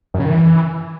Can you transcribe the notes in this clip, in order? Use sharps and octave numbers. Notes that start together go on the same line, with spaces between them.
F#2
C#3
D#3
E3